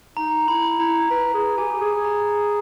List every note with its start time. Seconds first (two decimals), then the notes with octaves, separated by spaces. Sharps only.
0.17 D#4 A#5
0.48 E4 B5
0.79 E4 A#5
1.10 B4 A#5
1.34 G#4
1.57 G4 G#5
1.72 G4
1.81 G#4
2.05 A#5